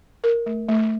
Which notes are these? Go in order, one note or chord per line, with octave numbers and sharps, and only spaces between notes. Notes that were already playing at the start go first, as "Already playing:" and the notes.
A#4
A3
A3